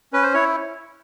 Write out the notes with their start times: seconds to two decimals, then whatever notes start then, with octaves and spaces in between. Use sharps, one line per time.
0.13 C#4 B4
0.23 C5
0.34 E4 C#5